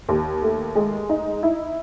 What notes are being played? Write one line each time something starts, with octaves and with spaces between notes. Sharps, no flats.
D#2
A3
G#3
D#4
E4